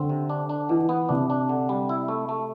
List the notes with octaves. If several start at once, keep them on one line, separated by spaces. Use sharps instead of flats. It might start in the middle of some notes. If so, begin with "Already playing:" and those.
Already playing: D3 C4
C3
D4
D4
B2 E3
B3
C3 D4
D4
D3
G3
E4
A3
A3